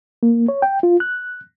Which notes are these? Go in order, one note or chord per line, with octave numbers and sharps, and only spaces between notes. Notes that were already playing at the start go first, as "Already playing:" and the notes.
A#3
C#5
G5
F4
F#6